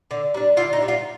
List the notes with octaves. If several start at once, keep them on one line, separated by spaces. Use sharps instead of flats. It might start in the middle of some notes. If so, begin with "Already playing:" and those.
D3
G3 D4
D3 F4
D#4
G3 D4
F4